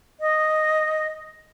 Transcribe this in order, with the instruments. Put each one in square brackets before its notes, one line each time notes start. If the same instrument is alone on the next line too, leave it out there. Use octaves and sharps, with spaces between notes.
[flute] D#5